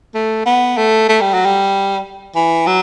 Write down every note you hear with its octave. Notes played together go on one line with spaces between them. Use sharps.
A3
B3
A3
A3
G3
F#3
G3
E3
F#3